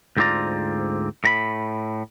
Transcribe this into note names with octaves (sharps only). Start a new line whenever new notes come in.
D2 G#2 C4 F4 D5 A#5
A2 A#5 B5